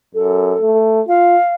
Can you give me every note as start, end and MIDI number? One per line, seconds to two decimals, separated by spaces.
0.15 0.54 42
0.15 0.78 69
0.61 1.01 57
1.08 1.36 65
1.08 1.54 77